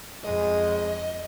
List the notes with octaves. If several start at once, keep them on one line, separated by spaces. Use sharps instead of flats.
F2 G#3 D#5